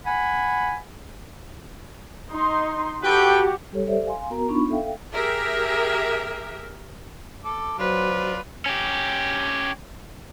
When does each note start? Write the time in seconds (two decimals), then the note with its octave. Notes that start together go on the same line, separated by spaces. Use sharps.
0.06 F#5 G#5 B5
2.31 D#4 C6
3.03 F#4 G4 A4 B4 G5
3.72 G3 G4 A4 C#5
3.87 G4 A4 C5 D5 E5
4.05 F5 G#5 C6
4.30 B3 F#4 A#4 A#5
4.48 B3 D4 D#4 F4 B5 C#6
4.70 A4 E5 F5 G5
5.14 G4 G#4 A#4 E5
7.45 A4 D6
7.79 F#3 D4 F4 B4 C5
8.66 C#4 G4